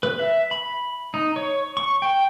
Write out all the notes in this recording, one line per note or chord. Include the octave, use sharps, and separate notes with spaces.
B4
E5
B5
D#4
C#5
C#6
G5